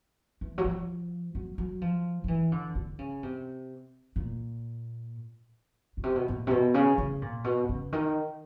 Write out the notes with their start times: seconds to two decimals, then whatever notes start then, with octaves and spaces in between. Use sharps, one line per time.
0.41 E3
0.58 F#3
0.64 F3
1.35 F#3
1.58 F#3
1.81 F3
2.24 F3
2.28 E3
2.52 D3
2.75 D3
2.99 C#3
3.23 C3
4.16 A#2
5.97 B2
6.04 C3
6.16 B2
6.28 A#2
6.47 C3
6.51 B2
6.74 C#3
6.98 C#3
7.22 A#2
7.44 B2
7.69 C#3
7.92 D#3